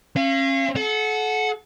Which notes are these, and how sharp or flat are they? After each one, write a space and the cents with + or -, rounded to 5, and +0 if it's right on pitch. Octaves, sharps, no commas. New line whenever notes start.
C#4 -35 F5 -30
A4 -35 F#5 -10